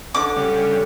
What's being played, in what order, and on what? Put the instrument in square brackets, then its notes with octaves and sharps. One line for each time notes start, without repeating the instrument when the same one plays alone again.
[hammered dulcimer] D3 [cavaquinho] D6
[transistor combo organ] C#3 G3